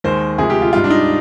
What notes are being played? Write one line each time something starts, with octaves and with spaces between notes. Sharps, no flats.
D#2 D#3 G#3 C5
D2 C3 F3 G#3 G#4
G4
F4
G#2 G3 F4
D4
D#4